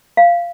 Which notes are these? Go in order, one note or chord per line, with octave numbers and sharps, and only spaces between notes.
F5